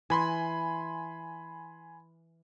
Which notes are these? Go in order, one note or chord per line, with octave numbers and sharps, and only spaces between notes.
E3 G#5 B5 C6